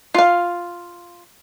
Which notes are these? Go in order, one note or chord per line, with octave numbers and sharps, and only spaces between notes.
F4 F5